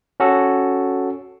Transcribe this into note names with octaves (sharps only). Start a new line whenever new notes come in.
C#4 F#4 A4